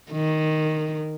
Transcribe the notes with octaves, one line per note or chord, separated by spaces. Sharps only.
D#3